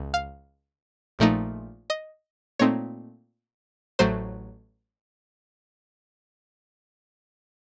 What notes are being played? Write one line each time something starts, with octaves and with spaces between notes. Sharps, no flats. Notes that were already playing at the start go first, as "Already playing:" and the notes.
Already playing: C#2
F5
A#1 A#2 F3 A3 D#4
D#5
A#2 A3 C4 D#4 C#5
A1 A2 F#3 A3 C5